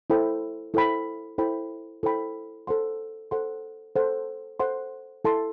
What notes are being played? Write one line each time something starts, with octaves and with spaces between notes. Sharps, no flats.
E4 A4 C5 G5 B5
E4 A4 C5 G5 B5
E4 A4 C5 G5 B5
E4 A4 C5 G5 B5
A4 C5 F#5 C6
A4 C5 F#5 C6
A4 C5 F#5 C6
A4 C5 F#5 C6
E4 A4 E5 A5 C6